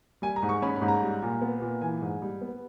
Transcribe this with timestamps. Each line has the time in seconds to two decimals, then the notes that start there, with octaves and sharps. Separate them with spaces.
0.22 G3 G#5
0.36 A#5
0.43 G#2
0.49 C#6
0.62 C#4 B5
0.76 B5
0.82 G#2
0.88 A#5
1.02 G3
1.22 A#2
1.41 B3
1.62 A#2
1.81 E3 G#5
2.02 G#2
2.22 G3
2.41 B3